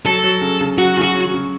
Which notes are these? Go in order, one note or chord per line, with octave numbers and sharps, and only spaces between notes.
F#3 A4
F#3
C#3
C#3
F#3 F#4
C#3
F#4
C#4
C#3